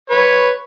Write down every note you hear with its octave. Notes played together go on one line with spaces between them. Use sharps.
B4 C#5